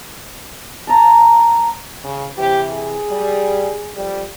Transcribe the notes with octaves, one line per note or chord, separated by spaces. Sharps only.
A5 A#5
C#3
C3 E3 G4
G#4
G3
F2 G3